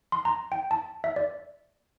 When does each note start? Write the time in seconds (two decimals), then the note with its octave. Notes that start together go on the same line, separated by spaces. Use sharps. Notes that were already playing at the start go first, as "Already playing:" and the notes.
0.12 C6
0.25 A#5
0.52 G5
0.71 A5
1.04 E5
1.16 D5